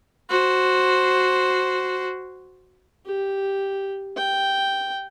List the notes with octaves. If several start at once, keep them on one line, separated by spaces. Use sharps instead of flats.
F#4 C5
G4
G5